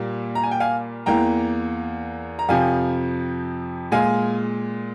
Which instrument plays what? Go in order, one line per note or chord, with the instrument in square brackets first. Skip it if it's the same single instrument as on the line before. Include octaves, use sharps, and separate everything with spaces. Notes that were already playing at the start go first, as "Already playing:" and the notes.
Already playing: [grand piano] A#2 G3 A#3
A#5
G#5
G5
F5 G#5
E2 E3 A#3 G5 A#5
A#5
F2 C3 F3 F5 G#5
A#2 G#3 F5 G#5